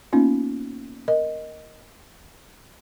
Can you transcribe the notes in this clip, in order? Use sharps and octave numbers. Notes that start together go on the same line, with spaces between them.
A#3 B3 C#4 D#4 F4
A#4 D#5